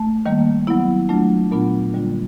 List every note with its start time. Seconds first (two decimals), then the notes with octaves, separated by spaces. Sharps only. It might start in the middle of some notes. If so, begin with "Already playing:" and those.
Already playing: A3
0.26 D#3 G3 A#3
0.67 F#3 B3 E4
1.09 F#3 A3 D4 F4
1.51 A#2 F#3 B3 D4 F4
1.94 D3 G3 A#3 D4 F4